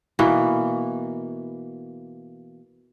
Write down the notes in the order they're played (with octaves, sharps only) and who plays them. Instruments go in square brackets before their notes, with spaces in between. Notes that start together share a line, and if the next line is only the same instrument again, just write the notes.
[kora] B2 E3 A#3